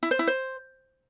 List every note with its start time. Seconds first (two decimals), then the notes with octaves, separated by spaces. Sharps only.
0.03 E4
0.11 C5
0.19 E4
0.27 C5